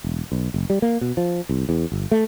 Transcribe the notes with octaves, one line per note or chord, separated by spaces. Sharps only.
E1
B1
F#1
G3
A#3
B2
F3
C2
E2
G1
A3